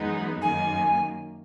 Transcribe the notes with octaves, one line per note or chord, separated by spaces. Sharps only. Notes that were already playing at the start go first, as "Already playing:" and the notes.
Already playing: F#2 E3 G#3 B3 D#4
F#2 D#3 A#3 G#5